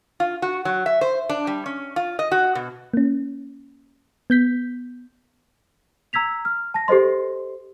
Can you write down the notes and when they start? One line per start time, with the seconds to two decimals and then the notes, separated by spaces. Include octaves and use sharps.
0.20 F4
0.42 F#4
0.65 F#3
0.86 E5
1.01 C5
1.30 D4
1.47 G3
1.66 C#4
1.96 F4
2.19 D#5
2.32 F#4
2.55 B2
2.94 A#3 C#4
4.30 B3 G6 B6
6.13 A#5 E6 G#6 B6 F7
6.45 F6
6.74 A5 A#6
6.88 G4 A4 C5 D#5 C6